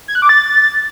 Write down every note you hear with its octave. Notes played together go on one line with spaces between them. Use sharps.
G#6
F#6
D6
A6